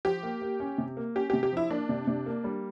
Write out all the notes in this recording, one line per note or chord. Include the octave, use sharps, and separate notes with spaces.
F3 G4
A#3
A#3
C#4
C3
A#3
C#4 G4
C3 G4
G4
F3 E4
A#3 D4
C3
C3
A#3
G3